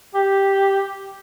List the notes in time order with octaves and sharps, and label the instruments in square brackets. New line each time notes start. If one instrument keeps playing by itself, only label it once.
[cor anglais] G4